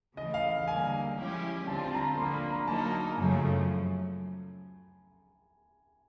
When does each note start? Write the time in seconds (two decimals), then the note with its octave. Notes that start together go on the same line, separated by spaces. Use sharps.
0.17 C#3 E3 A3 D#5
0.34 F5
0.67 D3 G3 A#3 G#5
1.18 F3 G#3 C#4 E4 G4
1.67 D3 G3 C4 F4 A5
1.84 A5
1.94 A#5
2.01 B5
2.17 D3 F3 A#3 C6
2.34 B5
2.50 A#5
2.67 F#3 A#3 D#4 A5
3.17 F#2 C#3 F3 A3 G#5